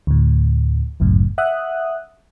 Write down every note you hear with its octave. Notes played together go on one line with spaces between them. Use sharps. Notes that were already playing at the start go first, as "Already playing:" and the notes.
D2 A2
G1 C#2 F#2 A2
E5 F#5 D#6 F#6